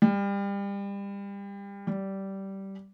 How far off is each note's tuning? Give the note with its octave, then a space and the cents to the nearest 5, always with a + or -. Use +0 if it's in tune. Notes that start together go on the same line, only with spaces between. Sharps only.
G3 +30
G3 -15